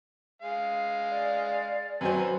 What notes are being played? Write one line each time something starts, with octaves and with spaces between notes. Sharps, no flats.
G#3 F5
D5
F#2 F#3 B4 C5 G#5